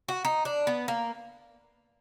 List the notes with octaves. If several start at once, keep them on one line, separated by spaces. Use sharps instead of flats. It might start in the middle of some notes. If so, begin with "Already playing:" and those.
F#4
D#4
D4
B3
A#3